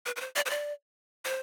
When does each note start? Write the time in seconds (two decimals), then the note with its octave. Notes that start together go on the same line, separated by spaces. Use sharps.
0.06 B4
0.16 B4
0.21 C5
0.36 D5
0.46 C5
0.50 D5
1.25 C5